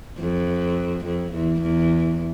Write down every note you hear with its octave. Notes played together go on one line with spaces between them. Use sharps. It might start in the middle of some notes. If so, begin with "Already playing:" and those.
F2
F2
E2
E2